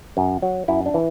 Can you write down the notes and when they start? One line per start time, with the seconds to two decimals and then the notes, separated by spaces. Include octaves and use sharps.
0.17 F#2
0.42 F#3
0.68 F#2 E4
0.86 D4
0.94 E3